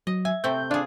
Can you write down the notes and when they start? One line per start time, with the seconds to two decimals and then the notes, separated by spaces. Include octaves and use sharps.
0.07 F#3 D#5
0.25 E5 G#5
0.44 C3 A3 C4 G6
0.71 D4 F4 G#4